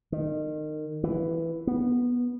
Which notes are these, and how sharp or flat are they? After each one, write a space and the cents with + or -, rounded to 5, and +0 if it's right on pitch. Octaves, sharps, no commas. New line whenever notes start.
D#3 -25
E3 +5
B3 -15